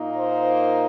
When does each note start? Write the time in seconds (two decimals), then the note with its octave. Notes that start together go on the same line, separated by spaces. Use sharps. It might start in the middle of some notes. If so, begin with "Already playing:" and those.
Already playing: A#2 A#3 D#4
0.17 C5